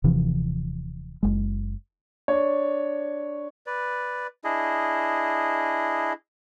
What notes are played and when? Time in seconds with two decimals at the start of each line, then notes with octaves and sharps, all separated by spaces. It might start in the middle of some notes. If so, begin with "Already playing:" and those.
0.04 D#1 C3 E3 F3
1.23 F#1 G#3
2.28 D4 C#5
3.66 B4 D5
4.44 D4 E4 G#4 D#5